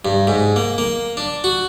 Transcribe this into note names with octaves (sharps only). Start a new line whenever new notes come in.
G2
G#2
A#3
A#3
D4
F#4